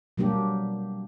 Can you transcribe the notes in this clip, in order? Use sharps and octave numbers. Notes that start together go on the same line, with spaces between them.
B2 F#3 G3 A#3 D4 G4